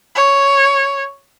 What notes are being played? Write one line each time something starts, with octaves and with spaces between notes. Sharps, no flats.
C#5